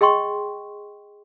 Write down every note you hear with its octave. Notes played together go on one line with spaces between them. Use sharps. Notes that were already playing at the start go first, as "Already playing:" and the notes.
G#4 D#5 G5 C6 C#6